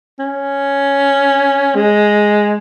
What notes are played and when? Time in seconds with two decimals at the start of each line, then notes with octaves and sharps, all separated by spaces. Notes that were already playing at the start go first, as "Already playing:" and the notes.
0.19 C#4
1.75 G#3